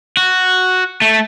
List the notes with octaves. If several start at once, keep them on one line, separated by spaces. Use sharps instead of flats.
F#4
A3